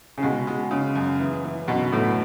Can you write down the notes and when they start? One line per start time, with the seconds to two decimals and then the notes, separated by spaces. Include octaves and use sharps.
0.18 C#3
0.23 B2 G#3
0.47 G#3
0.71 C#3
0.96 F#2
1.20 E3
1.44 E3
1.68 F#2 B2
1.92 A2 E3